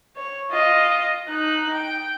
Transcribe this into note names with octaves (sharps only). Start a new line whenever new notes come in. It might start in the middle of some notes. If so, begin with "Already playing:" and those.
C#5
F4 D#5
D#4 F#6
G5